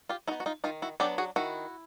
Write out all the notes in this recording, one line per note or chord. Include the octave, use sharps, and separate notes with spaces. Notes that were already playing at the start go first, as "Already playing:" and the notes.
F4 G4
B3 D#4 E4 F#4
F#4
D#4 F4
D#3 D#4 F4
E4 F#4
F#3 B3 D4 G4 A4
F#4 G#4
D#3 E4 F#4